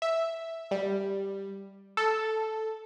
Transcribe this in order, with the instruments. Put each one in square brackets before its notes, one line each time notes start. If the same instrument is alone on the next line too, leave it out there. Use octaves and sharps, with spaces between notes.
[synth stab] E5
G3
A4